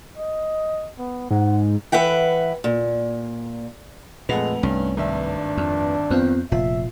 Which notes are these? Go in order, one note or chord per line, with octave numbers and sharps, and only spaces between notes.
D#5
B3
G#2 F#5
E3 B4 E5 F#5 G5
A#2
F2 A#2 G#3 A3 B4 F#5 F7
C2 G2 C#4
G#1 G2 D4 E5
F2
F2 B3 C4 F4
F1 A#2 F4 E5